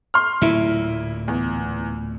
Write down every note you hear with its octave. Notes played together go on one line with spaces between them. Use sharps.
C6 F6
D1 A#2 E4
E2